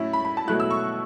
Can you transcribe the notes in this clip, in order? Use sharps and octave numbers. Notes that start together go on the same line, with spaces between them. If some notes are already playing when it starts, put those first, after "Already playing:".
Already playing: A2 F#3 C#4 E4
B5
B5
A5
B2 F#3 A3 E4 F#6
E6
C#6